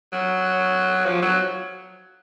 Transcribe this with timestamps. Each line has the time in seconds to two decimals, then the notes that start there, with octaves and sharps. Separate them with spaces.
0.13 F#3
1.06 F3
1.22 F#3